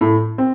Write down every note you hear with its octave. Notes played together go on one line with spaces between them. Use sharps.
A2
C4